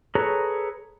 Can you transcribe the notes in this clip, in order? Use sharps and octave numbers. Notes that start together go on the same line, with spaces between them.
G#4 A4 B4 C#5 A#5